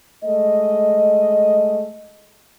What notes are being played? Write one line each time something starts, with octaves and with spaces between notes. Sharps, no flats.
G#3 A3 D#5